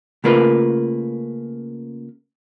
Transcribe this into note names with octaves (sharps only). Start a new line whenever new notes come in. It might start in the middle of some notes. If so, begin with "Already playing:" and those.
C#3 A3 A#3 F4 A#4 B4